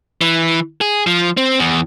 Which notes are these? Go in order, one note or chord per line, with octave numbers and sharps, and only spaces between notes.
E3
G#4
F3
C4
E2